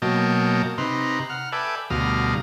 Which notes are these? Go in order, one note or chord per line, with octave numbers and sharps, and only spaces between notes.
B2 F#3 A#3 D#5 G5 A5
C3 D#4 B4 A#5 C6
F#5 F6
A4 B4 D5 E5 G5 G#5
D2 B2 G3 F5 A#5 D#6